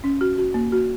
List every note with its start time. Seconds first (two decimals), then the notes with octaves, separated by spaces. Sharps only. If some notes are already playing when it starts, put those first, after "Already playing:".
0.04 C#4
0.21 F#4
0.38 F#4
0.54 A#3
0.72 F#4